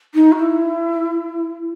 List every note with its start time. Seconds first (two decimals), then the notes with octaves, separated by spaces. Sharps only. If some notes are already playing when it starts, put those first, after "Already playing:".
0.14 D#4
0.32 F#4
0.36 E4